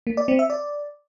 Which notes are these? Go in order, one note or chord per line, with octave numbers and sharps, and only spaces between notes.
A#3
D5
C4
E5
D5